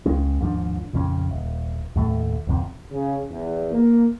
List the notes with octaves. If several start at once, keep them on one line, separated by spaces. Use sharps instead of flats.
C#2 G#3 C#4
D#2 G#2 F3 D4
A#1 F2 C#3 C#4
D#1
D#2 A2 A3
D1 F2 C3
C#3
E2
A#3